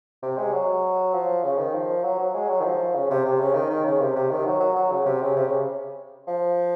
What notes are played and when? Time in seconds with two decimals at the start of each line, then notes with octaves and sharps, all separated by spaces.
0.22 C3
0.37 G#3
0.53 F#3
1.13 F3
1.44 C#3
1.58 D#3
1.74 F3
2.04 F#3
2.19 F#3
2.34 G#3
2.49 F#3
2.60 D#3
2.64 F3
2.95 C#3
3.10 C3
3.25 C3
3.40 C#3
3.54 D#3
3.70 D#3
3.85 C#3
4.00 C3
4.15 C3
4.31 D#3
4.45 F#3
4.60 F#3
4.76 F#3
4.91 C#3
5.05 C3
5.22 C#3
5.36 C3
5.47 C#3
6.27 F3